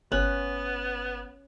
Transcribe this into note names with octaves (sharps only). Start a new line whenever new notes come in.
G1 B3 C#4 F#6